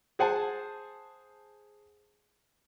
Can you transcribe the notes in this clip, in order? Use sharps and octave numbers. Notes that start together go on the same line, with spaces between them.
G#4 C5 F#5 G#5 A5